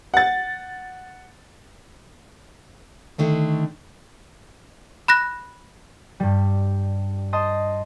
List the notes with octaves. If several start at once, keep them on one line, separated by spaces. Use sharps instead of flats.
F#5 A6
D3 D#3 A3 D4
B5 F#6 A#6
G2 G3
C5 D#5 A5 C6 D#6